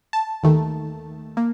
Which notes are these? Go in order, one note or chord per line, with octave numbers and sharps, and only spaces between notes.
A5
D#2 D#3 A3
A#3